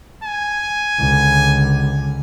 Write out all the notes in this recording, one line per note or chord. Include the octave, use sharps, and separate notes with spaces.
G#5
C#2 D3